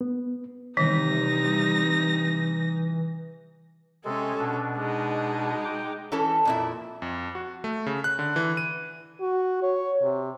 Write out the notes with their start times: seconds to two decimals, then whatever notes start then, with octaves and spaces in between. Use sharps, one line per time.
0.01 B3
0.77 C3 D#3 E3 G3 D#4 A#6
4.05 C3 G#3 C#4 A4
4.39 B2 D4
4.76 G#3 D#4
5.65 G5 D6
6.12 E3 C#4 A4
6.45 F2 A#2 E4
7.02 F2
7.35 F#4
7.64 A3
7.86 C#3
8.04 F#6
8.19 D3
8.36 E3
8.57 D#7
9.21 F#4
9.63 C#5
10.03 C3